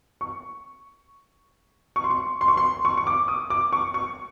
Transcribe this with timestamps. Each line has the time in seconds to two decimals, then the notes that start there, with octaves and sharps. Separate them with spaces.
0.21 C#6
1.96 C#6
2.04 C6
2.10 C#6
2.41 C6
2.48 C#6
2.57 C6
2.85 C#6
2.97 C#6
3.07 D6
3.28 D#6
3.50 D6
3.73 C#6
3.94 C#6